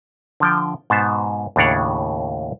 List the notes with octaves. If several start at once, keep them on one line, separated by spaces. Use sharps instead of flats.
D3 F3 G5
G#2 B2 B3 C5 A5
D#2 A2 C#3 D4 C#5 F#5